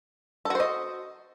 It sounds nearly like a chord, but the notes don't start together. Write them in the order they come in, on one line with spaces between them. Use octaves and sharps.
A4 F#4 C5 D#5